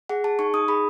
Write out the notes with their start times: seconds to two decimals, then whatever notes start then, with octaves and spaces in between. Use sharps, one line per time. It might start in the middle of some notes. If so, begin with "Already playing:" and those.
0.09 G#4 F#5
0.24 G#4 A5
0.39 D#4 C#6
0.54 D#4 D#6
0.68 G#4 B5